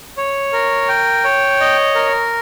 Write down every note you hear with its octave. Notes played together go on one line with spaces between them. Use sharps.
C#5
A#4
G5
C#5
D#5
A#4